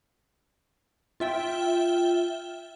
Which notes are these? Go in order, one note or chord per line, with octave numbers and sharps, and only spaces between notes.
F4 E5 G5